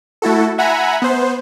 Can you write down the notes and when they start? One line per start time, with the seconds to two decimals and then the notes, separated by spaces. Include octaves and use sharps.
0.22 A3 E4 F#4 A4
0.58 E5 F#5 G#5 A#5 B5
1.02 B3 C5